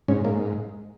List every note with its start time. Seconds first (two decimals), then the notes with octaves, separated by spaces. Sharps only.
0.08 G#2 C#4
0.24 G#2 A#3